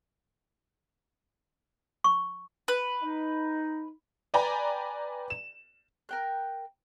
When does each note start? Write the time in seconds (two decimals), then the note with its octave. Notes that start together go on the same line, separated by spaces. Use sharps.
2.04 C#6
2.68 B4
3.03 D#4
4.34 B4 D5 G5 G#5 A#5 B5
5.30 E7
6.09 A#4 G5 F#6